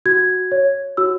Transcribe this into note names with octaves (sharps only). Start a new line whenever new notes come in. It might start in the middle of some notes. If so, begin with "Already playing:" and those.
F#4 G#6
C#5
F#4 E6